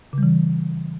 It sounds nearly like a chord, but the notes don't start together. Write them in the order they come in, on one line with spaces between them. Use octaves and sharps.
C#3 G3 E3